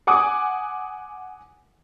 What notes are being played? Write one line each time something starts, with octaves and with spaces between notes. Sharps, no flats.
F#5 G#5 D6 D#6